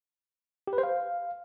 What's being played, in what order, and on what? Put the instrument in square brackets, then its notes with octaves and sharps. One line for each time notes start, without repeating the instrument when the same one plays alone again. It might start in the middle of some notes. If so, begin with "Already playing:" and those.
[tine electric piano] G4
B4
C5
F5